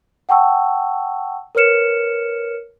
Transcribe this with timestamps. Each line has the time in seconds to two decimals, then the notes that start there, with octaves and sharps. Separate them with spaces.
0.29 F#5 G5 A5 C#6 E6
1.55 A#4 B4 C#5 F6 C#7 E7